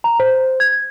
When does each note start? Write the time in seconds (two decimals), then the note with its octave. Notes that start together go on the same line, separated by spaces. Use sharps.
0.04 A#5
0.20 C5
0.60 G#6